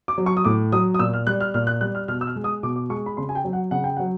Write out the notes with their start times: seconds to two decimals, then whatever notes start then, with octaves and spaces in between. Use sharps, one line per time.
0.08 D6
0.18 F#3
0.26 C#6
0.37 D#6
0.45 A2 D6
0.72 F#3 D#6
0.94 D#6
0.99 A#2 E6
1.13 F6
1.27 G3 F#6
1.40 F6
1.54 A#2 F6
1.67 F#6
1.81 G3 F#6
1.95 F6
2.08 B2 F6
2.21 E6
2.27 F6
2.36 G#3
2.44 D#6
2.63 B2 D6
2.76 D6
2.90 G#3 C#6
3.06 B5
3.17 C#3 C6
3.29 G#5
3.35 G5
3.44 F#3
3.53 F#5
3.71 C#3 F#5
3.84 G5
3.97 F#3 F#5